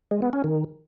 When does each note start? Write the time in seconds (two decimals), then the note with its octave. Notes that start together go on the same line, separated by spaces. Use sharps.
0.11 G#3
0.22 B3
0.33 C#4
0.44 D#3